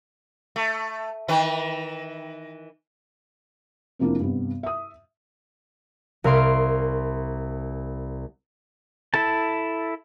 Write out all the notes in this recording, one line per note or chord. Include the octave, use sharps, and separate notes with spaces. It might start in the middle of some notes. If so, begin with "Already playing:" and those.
A3
D#3 E3 B4
F2 C3 F3 A#3 D4 E4
G2 C3 B3
E5 D#6
C2 A#4 F5 C6 D7
E4 A4 A5